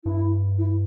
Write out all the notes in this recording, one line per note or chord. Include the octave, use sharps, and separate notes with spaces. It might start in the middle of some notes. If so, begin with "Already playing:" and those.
G2 E4
E4